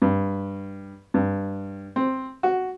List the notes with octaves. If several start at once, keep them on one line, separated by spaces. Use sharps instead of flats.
G2
G2
C4
F#4